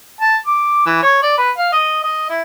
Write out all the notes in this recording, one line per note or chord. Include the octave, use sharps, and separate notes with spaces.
A5
D6
E3
C#5
D5
B4
F5
D#5
D#5
E4